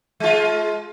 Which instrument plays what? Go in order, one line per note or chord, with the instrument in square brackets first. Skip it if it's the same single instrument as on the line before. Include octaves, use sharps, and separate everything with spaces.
[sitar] G#3 F4